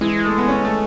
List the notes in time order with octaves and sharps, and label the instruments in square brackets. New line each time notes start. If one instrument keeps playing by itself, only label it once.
[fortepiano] E3 [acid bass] G#3
[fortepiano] A3
B3
C#4
A3